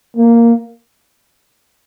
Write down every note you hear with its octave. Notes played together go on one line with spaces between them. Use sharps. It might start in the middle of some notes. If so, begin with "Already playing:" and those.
A#3